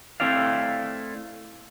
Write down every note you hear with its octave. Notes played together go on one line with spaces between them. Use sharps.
A3 C4 E4 D5 F5